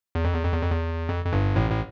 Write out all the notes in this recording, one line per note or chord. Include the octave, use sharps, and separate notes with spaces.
E2
F2
E2
F2
E2
F2
E2
F2
F2
G1 G2
A1 A2
A2